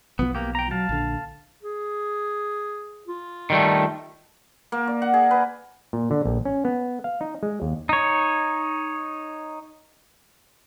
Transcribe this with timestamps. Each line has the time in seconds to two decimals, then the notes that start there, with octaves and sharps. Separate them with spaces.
0.19 B1 B2 F3 B3
0.35 A#3 G4
0.55 G5 A#5
0.71 F#3 F5 A5
0.89 A#1 D3
1.63 G#4
3.08 F4
3.50 D#3 G3 A3
4.72 A#3
4.87 D5
5.02 F#5
5.14 G#4
5.31 B4
5.93 A#2
6.11 D3
6.25 A#1
6.45 C#4
6.65 B3
7.04 F5
7.21 D#4
7.43 G#3
7.62 D#2
7.89 D#4 C#5